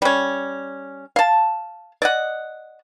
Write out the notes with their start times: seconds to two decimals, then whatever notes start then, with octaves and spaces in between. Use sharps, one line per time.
0.02 G3 C#4
1.16 F5 A5
2.02 D5 D#5 F#5